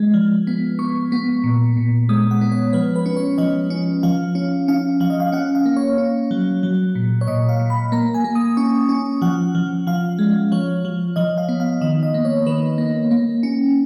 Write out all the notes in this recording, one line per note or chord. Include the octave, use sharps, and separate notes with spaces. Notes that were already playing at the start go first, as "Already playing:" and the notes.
Already playing: G#3
F3
B3
B3 C#6
B3
A#2
A#2
G#3 D#6
F#5
B3
C#5
F3 B4
B4
C#4
C#5
F3 D#5
C#4
F3 F5
C#4
C#4 F5
F3 F5
D#5
F5
C#4 F#5
F5
A#3
C#5
C#4
F#3
F#3
A#2
C#5
A#2 D#5
F5
A#2
B5
A#3 A#5
G#5
A#3
D#6
C#4 C#6
C#4
F3 F#5
F3
F3 F5
G#3
F3 C#5
F3
F3 D#5
F5
B3
F5
D#3 D#5
D#5
A#3
C#5
D#3 B4
A#3
A#3
C#4